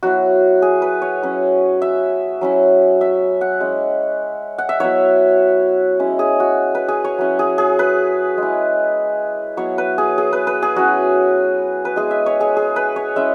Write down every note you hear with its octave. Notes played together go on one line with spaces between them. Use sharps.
F#3 B3 E4 F#4
G#4
B4
C#5
F#3 C#4 E4
E5
F#3 C#4 E4
E5
F#5
G#3 C#4 E4
F#5
E5
F#3 B3 E4 C#5
G#3 C#4 E4
G#4
F#4
B4
G#4
C#5
F#3 C#4 E4
G#4
G#4
B4
G#3 E4
F#3 B3 E4 C#5
B4
G#4
G#4
B4
B4
G#4
F#3 C#4 E4 F#4
B4
G#3 B3 E4 G#4
E5
C#5
G#4
G#4
B4
C#5
G#3 C#4 E4 E5